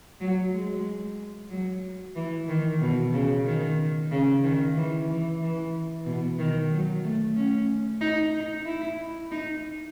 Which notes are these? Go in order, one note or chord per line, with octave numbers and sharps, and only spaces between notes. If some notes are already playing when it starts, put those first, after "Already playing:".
F#3
G#3
F#3
E3
D#3
B2
C#3
D#3
C#3
D#3
E3
E3
E3
B2
D#3
F#3
A3
C#4
D#4
D#4
E4
D#4